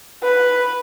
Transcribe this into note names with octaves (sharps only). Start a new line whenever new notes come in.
B4